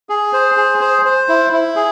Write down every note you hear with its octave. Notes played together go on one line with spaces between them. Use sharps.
G#4
C5
G#4
C5
C5
E4
E4
G#4